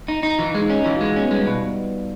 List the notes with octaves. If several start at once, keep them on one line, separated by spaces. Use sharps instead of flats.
D#4
D#4
E3 F4
G#3
D#4
C#4
E3 F4
F#4
G#3
B3 C#4
G3 G#3
B2